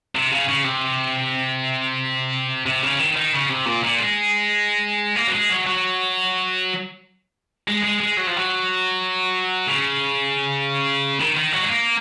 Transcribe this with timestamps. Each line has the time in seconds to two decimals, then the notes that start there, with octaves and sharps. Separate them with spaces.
0.15 C3
0.31 C#3
0.48 C#3
0.64 C3
2.66 C3
2.83 C#3
2.99 D#3
3.16 D#3
3.33 C#3
3.50 C3
3.66 A#2
3.83 A#2
3.99 G#3
5.16 A#3
5.28 F#3
5.33 G#3
5.50 F#3
5.66 F#3
7.68 G#3
7.84 G#3
8.00 G#3
8.17 F#3
8.27 F3
8.37 F#3
9.68 C#3
11.19 D#3
11.36 D#3
11.52 F#3
11.63 G#3
11.68 A#3